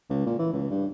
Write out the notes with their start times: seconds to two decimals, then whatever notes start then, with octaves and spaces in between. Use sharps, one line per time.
0.10 C#2
0.27 A#2
0.39 E3
0.53 C#2
0.70 G2